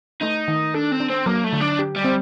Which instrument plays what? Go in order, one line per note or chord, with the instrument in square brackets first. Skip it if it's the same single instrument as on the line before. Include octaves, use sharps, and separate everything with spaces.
[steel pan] A3 [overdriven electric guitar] D#4
[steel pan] D#3
[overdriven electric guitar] D4 [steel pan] A4
[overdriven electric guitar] C4
[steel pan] D4
[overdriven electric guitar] C4
[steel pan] F#3 [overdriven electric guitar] A#3
[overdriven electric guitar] A3
[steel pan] D3
[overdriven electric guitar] D4
[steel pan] G4
[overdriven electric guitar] G3
[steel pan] C4